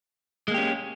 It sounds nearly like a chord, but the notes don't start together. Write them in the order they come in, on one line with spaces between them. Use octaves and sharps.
G#3 A#3 G4 C#4